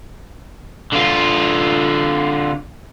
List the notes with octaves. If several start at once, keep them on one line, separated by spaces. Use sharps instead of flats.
D3 F4